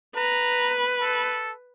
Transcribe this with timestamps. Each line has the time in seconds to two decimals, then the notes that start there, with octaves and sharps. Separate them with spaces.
0.16 B4 A#5
1.01 A4